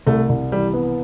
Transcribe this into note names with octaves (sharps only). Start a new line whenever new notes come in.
C2 A3
C2
E3 G3
B3